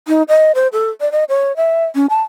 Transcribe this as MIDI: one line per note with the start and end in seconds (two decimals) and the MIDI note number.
0.08 0.23 63
0.28 0.52 75
0.55 0.68 72
0.73 0.89 69
1.01 1.11 74
1.12 1.24 75
1.29 1.55 73
1.57 1.85 76
1.95 2.06 61
2.10 2.21 81